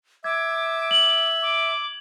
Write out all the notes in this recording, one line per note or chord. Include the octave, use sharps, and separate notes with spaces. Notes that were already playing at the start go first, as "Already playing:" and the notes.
E5 D6 G#6
F#7
D6